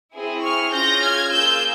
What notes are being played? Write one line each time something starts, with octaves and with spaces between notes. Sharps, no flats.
C4 E4 G#4
C#6 F6
C#4 F4 G#4 G6 A#6
F6 G#6
A#3 F4 G#4 E6 G6